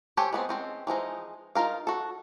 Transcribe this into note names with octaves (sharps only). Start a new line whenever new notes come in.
G4 A4 C5 C#5 G#5
G#3 B3 C4
G#3 C4 C#4
E3 F3 G#3 D#4
D#4 F4 A#4 F5
F#4 A4